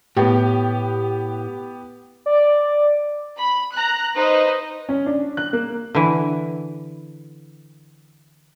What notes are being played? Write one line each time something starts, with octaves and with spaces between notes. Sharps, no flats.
A2 B3 G4
D5
B5
A#5 F#6
D#4 B4 C5 D#5
C#4
D4
F#6
A#3
D3 E3